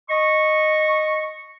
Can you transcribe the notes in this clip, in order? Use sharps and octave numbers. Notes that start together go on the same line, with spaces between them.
D#5 C#6